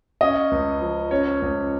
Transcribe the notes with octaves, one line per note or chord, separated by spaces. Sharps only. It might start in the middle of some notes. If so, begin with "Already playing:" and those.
C#4 D#5
C#2
F3
C#4 C#5
C#2